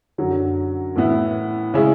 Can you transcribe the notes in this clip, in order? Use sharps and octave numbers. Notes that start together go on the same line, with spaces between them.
F#2 D3 F#3
A2 E3 B3 E4
C#3 G#3 C#4 E4 G#4